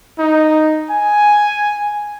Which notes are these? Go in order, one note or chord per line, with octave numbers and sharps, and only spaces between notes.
D#4
G#5